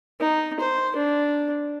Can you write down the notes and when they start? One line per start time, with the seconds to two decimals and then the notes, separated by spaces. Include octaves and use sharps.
0.20 D#4
0.60 C5
0.96 D4